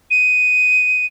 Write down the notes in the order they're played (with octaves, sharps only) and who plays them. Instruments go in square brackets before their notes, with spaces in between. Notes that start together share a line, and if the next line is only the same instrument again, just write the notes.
[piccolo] D#7